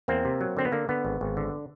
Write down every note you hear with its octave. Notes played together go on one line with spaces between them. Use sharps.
E2 A#3 C4
C3
F#3
D3 C4
B3
D3 A#3
D3 B3
G#1
G#1
D3